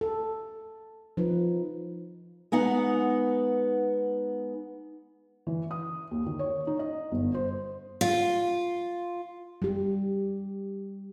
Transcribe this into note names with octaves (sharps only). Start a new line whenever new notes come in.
A4
F3 D#4 B4
G#3 B3 D#4 F#5
E3
D#6
D#2
D#3
C#5
D#4
D#5
G1
C5
F4
G3 G4